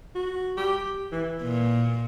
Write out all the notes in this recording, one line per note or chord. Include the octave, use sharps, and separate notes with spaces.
F#4
G4
E3
A#2